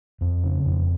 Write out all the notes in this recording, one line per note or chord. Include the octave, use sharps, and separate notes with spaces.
F2
C#3
F2